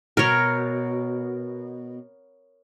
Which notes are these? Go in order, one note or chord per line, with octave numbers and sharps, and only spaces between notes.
B2 A#4 C#5